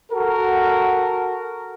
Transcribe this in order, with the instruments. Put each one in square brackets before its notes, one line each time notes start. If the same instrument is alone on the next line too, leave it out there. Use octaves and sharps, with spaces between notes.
[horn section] F#4 A4 A#4